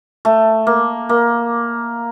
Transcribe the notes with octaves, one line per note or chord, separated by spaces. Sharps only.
A3
A#3
A#3